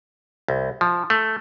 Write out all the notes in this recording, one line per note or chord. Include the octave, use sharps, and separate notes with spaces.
C2
F3
A3